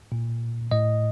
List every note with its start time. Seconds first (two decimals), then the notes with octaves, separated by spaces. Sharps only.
0.12 A#2
0.71 A2 D#5